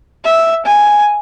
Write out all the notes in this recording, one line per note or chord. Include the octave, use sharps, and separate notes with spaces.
E5
G#5